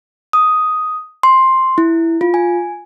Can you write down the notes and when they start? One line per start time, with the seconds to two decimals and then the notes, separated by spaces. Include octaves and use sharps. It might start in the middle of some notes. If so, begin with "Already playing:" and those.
0.33 D#6
1.23 C6
1.78 E4
2.21 F4
2.34 G#5